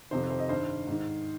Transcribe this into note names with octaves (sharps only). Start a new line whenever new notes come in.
F2 C3 D#3 C5
C5
D#5
G2 D#3 C5
G#2 D#3